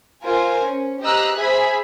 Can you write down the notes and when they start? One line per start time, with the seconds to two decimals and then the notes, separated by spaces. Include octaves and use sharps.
0.24 F4 A#4 C5 G#5
0.65 C#4
1.02 G4 C5 D#5 A#5 E6 F#6
1.36 G#4 C5 E5 G#5 B5